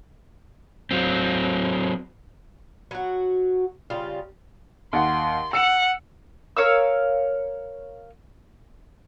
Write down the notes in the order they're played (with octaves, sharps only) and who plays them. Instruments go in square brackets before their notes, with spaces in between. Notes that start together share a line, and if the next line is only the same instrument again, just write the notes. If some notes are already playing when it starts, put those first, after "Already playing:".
[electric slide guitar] F#3 C4
[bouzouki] F#3 F#4
C#3 G3 F4
[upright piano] D#2 F#5 [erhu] C6
[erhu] F#5 [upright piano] E6 C#7 E7
[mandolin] A#4 C#5 F5 E6